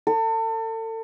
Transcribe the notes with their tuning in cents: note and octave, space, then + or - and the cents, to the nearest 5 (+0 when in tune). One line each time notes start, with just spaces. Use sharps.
A4 +35